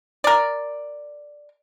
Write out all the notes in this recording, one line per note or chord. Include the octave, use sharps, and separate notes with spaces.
A#4 D5